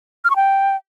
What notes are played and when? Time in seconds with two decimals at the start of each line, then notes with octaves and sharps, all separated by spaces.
0.25 F6
0.30 C#6
0.36 G5